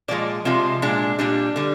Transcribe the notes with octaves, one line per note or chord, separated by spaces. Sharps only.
A#2 F3 G#3 D5
C3 F3 G#3 F4
A#2 G#3 D4
A#2 G3 D4
D3 G3